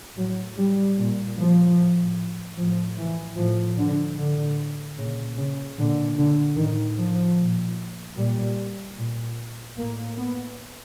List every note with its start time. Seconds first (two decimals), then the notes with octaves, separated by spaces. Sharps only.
0.16 A2 F#3
0.56 G3
0.97 A#2
1.37 F3
1.76 A2
2.56 A2 F3
2.97 E3
3.36 A2 F3
3.77 D3
4.16 A2 D3
4.96 A#2 C#3
5.36 C#3
5.77 A#2 D3
6.17 D3
6.57 A2 D#3
6.98 F3
7.38 A#2
8.17 A#2 G3
8.97 A#2
9.78 A2 A#3
10.18 B3